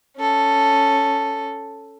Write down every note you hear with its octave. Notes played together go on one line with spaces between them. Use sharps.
C#4 A4